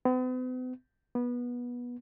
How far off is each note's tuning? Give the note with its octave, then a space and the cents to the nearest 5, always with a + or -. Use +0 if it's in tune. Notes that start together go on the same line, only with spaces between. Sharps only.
B3 +45
B3 -20